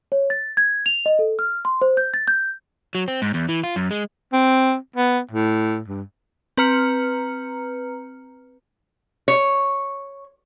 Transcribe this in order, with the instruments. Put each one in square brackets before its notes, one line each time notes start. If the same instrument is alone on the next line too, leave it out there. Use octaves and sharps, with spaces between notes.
[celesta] C#5
A6
G#6
F7
D#5
A4
F6
C6
C5
G6
A6
G6
[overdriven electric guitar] F#3
C4
G#2
E2
E3
F4
F#2
G#3
[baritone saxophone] C4
B3
A2
G2
[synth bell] C4 B4 A#5 F6 C#7
[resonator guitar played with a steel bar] C#5